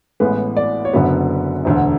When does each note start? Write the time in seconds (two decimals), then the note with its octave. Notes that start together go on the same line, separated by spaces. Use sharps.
0.20 A1 A2 G#3 B3 B4
0.57 D5
0.85 C#5
0.93 F#1 F#2 D3 F#3 B3 B4
1.65 E1 D2 D3